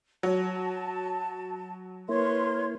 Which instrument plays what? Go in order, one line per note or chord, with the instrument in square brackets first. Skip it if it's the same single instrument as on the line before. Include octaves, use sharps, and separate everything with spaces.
[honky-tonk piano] F#3 [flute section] A5
[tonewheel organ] A#3 E4 [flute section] A#4 B4 C6 [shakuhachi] C#5